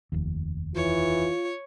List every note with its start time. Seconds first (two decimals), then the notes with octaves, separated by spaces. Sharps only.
0.12 F1 D#2
0.76 E3 F4 C#5